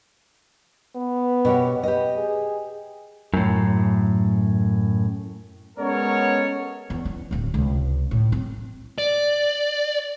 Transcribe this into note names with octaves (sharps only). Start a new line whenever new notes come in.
B3
B2 G4 C#5
G4 B4 D#5
G#4
F#2 A2
G#3 B3 C#4 A4 A#4 C#5
E2
C#4
D1 D#2
C#2 C3
A2
C4
D5